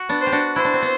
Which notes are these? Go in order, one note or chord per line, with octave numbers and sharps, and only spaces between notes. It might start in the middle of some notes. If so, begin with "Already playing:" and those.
Already playing: F#4
B3 D4
C5
G4
D4 F#4
E4 C5
D4
C4
B3